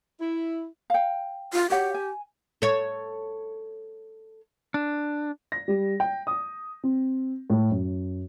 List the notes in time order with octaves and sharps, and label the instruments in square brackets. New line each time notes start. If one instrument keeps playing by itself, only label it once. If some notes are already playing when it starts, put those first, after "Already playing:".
[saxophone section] E4
[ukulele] F5 G5
[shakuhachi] F4
[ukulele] F#4 C#5 F#5 [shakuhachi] G4
[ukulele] G#5
[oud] A4 C#5
[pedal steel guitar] D4
[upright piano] A#6
G3
G5
D#6
C4
A2
F#2